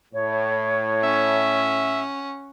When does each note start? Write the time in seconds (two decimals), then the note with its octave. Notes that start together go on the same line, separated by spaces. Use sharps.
0.14 A2 C#5
1.03 C#4 E5 F#5